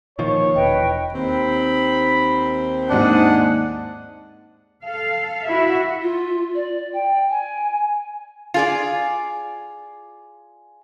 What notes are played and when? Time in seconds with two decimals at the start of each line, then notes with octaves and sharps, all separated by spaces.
0.19 A#2 D#3 F3 C#5
0.56 E1 B4 D#5 G5
1.13 D#2 C4 B5
2.89 G#2 A#3 D4 F#5
4.83 A4 F5
5.47 E4 F#4 E5
6.02 F4
6.55 D5
6.94 G5
7.30 G#5
8.54 F4 G#4 D5